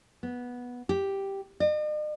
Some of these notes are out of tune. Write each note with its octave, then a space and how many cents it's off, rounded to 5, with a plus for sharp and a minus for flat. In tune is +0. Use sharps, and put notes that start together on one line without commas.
B3 -10
G4 +0
D#5 -45